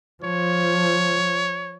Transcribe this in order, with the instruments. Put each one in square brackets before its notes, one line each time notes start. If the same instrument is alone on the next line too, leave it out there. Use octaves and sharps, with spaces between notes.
[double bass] F3 [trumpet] C#5